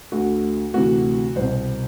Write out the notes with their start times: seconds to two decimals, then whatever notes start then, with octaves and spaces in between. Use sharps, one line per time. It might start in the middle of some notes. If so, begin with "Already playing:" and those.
0.12 D2 D3 F#4
0.74 D2 C3 E3 F#4
1.36 C2 B2 C5